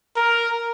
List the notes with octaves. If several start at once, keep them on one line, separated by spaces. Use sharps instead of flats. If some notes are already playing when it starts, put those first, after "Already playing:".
A#4